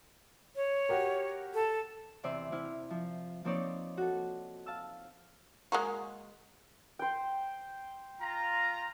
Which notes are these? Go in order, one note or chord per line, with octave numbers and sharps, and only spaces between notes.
C#5
F#4 G4 A#4
A4
E2 C3 D5 E5 C6
C3 E4 F6
F3
F3 A#3 C4 D#4 C#5 D5
F#4 A4
F5 A5 E6
G#3 A#3 F#4
C5 G5
F4 A#5